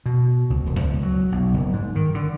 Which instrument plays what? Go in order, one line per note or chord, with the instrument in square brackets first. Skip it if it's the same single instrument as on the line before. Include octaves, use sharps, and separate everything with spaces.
[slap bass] B2
C#2
E1
C#2
F#3
B1
F#1
G#2
D#3
D3